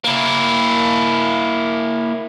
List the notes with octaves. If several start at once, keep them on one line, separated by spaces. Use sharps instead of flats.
A#3 E4